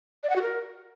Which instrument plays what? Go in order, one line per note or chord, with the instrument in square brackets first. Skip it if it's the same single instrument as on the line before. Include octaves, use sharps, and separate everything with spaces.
[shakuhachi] D5
F#5
F#4
A#4